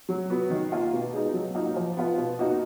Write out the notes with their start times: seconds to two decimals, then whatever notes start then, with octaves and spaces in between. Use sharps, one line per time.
0.09 F#3
0.30 B3 F#4
0.50 D#3
0.72 A#3 F4
0.93 B2
1.13 G#3 D#4
1.34 F#3
1.55 A#3 D#4 F#4
1.76 F3
1.97 B3 F4
2.18 B2
2.39 A#3 D#4 F#4